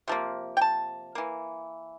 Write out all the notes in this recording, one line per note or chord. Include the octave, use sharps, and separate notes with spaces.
C3 F3 A#3
G5
A5
E3 A#3